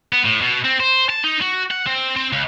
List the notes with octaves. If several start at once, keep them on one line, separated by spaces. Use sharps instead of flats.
B3
A2
B2
C4
C5
A5
D#4
F#4
F#5
C4
C4
C#2